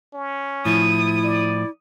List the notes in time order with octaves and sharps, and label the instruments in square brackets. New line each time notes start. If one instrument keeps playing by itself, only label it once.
[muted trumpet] C#4
[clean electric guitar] A2 F3 [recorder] E4 [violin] D#6
[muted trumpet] D5